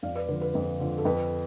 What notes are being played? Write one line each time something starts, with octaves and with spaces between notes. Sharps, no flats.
F2 D5 F5
B4 D5
D3 F3 B4
B4
F2 B4
D3 F3
A4
F2 B4